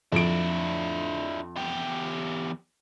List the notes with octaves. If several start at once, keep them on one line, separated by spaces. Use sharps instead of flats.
F2 D4 E4 D7
E2 G4